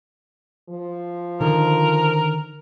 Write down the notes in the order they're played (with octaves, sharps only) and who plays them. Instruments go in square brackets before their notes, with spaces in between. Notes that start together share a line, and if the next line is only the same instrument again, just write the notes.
[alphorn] F3
[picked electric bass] D3 D#3 [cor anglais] A#4